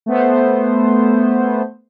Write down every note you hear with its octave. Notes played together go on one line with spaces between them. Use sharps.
A3 B3 C5